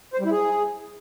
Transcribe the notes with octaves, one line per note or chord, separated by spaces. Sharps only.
C5
G3
E4
G#4